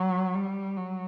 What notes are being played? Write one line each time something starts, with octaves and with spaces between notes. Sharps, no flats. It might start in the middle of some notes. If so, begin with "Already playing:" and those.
Already playing: F#3
G3
F#3